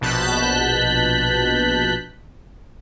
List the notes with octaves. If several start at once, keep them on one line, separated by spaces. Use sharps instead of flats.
A#1 B2 A5 F#6 G6 B6